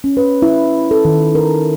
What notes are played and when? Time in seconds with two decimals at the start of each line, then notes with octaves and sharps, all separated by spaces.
0.04 C#4
0.17 B4
0.42 E4
0.91 A4
1.05 D#3
1.35 A#4